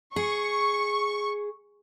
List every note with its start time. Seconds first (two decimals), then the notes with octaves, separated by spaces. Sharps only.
0.16 G#4 C#6